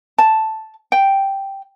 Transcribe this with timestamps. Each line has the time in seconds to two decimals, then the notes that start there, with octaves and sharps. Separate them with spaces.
0.18 A5
0.92 G5